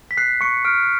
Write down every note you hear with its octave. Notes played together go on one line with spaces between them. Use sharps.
B6
F#6 C7
C#6 C#7
F6 D7